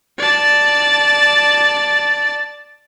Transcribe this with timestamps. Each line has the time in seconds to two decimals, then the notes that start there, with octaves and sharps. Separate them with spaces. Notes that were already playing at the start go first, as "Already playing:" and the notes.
0.18 D5 A5